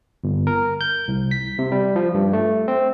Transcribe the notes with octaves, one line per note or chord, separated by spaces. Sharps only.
G1
A#4
G6
C2
B6
C3
G3
F3
G2
A3
C4